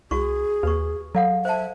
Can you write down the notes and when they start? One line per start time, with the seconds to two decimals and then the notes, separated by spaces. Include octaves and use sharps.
0.11 C2 F#4 G#4 C#6
0.63 D#2 B4 C#6
1.15 F#3 A4 F5 F#5
1.45 C5 E5 A5